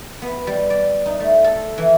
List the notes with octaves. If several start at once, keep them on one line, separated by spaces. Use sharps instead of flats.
B3
G3
D5
D#4
A3
A4
E3